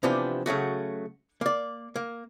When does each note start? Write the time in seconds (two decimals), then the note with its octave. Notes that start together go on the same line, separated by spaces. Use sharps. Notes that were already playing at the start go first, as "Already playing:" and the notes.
0.03 C3 E3 F3 B3 D4 G4
0.46 C#3 F#3 A3 F#4
1.41 A#3 D5
1.96 A#3